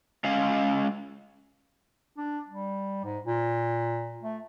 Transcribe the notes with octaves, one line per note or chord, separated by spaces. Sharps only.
G#3 C#4 F5
D4
G3
G#2
A#2
A3